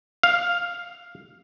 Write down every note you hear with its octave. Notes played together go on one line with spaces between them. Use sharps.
F5